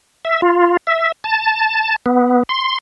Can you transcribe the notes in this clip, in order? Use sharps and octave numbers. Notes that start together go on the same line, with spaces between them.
E5
F4
E5
A5
B3
C6